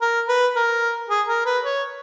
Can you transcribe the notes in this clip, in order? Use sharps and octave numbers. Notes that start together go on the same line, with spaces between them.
A#4
B4
A#4
G#4
A#4
B4
C#5